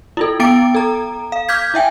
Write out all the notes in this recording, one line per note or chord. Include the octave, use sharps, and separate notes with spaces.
E4 F4 A4
B3 G5 D6 A6 D7
A4 A#5
F5
D6 F6 G6 G#6 B6
E4 E5 G5 G#5